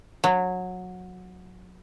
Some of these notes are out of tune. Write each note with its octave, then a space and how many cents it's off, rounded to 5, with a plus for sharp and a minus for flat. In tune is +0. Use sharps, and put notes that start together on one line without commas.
F#3 -20